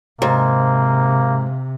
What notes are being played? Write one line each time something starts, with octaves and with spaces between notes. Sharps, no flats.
G#2 C3 A#3